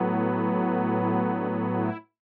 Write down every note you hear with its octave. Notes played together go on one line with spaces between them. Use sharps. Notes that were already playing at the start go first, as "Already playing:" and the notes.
Already playing: A2 F#3 B3
E4
D4
E4